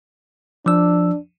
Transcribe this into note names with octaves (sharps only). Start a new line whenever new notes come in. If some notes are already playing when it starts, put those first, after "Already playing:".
F3 D4 E6